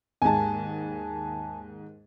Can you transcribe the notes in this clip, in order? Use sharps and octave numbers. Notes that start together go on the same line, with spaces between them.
D#2 G#2 G#5 A5